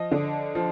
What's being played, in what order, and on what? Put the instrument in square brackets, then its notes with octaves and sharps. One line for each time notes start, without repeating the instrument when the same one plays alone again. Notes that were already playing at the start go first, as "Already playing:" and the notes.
Already playing: [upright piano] F3 D#5
D3
F3